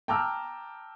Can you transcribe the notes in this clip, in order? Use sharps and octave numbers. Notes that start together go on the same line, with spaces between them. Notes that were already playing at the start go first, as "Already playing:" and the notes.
G5 A5 A#5 D6 E6 F6